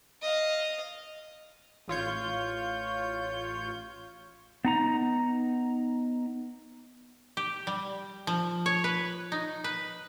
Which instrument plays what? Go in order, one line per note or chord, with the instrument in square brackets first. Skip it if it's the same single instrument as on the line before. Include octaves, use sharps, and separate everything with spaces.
[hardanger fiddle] D#5 F5
[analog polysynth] A1 F4 C#5 G6
[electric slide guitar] B3 D#4 A#5
[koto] G4
G3
F3
C#5
B4
D#4
B4